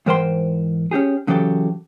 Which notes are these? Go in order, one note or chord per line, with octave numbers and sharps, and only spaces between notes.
G#2 E3 A#4 C5 G5 C6
C#4 D#4 G4 G#4
F#2 C#3 E3 F#3 G4 A4